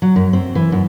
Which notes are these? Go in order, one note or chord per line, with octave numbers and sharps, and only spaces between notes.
F#3
F#2
C4
E3
F#2